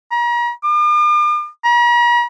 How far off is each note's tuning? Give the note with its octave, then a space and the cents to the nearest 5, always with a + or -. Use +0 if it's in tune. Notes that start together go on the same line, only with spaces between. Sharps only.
A#5 +40
D6 +45
A#5 +45